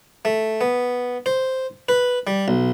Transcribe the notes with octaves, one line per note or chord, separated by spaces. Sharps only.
A3
B3
C5
B4
G3
B1